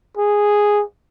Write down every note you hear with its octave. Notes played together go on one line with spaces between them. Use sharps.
G#4